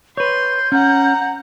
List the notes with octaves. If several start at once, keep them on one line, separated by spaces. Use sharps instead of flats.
B4 C#5 C6 G6
C#4 F#5 A#5